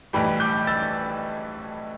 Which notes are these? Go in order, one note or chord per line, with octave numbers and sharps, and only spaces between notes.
B1 A2 E3 G3 G5 B5
D6 G6
E6 A6